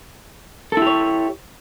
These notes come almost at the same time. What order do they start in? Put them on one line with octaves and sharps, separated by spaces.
A4 E4 G4 C#5